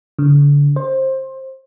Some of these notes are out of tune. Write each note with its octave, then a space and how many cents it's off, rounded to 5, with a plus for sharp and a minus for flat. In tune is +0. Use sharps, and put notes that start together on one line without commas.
D3 -35
C5 +20